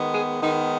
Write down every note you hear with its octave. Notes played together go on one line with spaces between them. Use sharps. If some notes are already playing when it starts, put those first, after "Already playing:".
Already playing: D#3 G#3 B3
G#4
D#3 G#3 B3 D#4